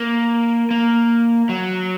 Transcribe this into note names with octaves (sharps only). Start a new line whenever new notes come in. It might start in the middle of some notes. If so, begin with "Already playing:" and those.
Already playing: A#3
A#3
F#3